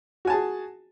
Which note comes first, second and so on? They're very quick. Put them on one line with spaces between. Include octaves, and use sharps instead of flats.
F#4 G#5 A5 G#4